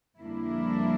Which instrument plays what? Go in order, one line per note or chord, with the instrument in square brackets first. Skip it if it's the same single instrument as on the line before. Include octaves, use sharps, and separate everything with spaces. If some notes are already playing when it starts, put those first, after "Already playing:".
[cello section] F2 D3 G3 A#3 D4 E4